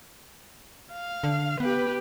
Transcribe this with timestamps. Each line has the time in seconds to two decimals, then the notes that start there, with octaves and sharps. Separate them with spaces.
0.93 F5
1.24 D3
1.60 B3 G4 B4